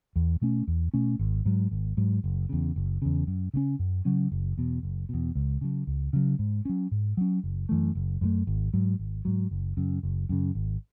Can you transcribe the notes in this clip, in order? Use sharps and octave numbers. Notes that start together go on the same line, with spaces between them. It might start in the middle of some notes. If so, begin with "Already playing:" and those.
E2
B2 A3 C#4
E2
B2 A3 C#4
G#1
G#2 F#3
G#1
G#2 F#3
F#1
E2 C#3
F#1
E2 C#3
F#2
C#3 F#3 C#4
F#2
C#3 F#3 C#4
F#1
E2 B2
F#1
E2 B2
C#2
C#3 F#3
C#2
C#3 F#3
G#2
F#3 C#4
G#2
F#3 C#4
F#1
F#2 E3 A3
F#1
F#2 E3 A3
G#1
G#2 F#3
G#1
G#2 F#3
F#1
F#2 C#3
F#1
F#2 C#3
G#1